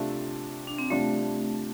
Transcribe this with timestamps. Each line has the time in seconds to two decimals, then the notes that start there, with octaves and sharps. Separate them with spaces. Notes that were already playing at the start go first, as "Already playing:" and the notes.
Already playing: C3 A3 D4 F4
0.67 D4
0.78 C4
0.90 C3 G3 A3 D4 F4